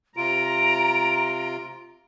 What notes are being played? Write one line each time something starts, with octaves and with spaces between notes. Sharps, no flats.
C3 F4 A#5 D7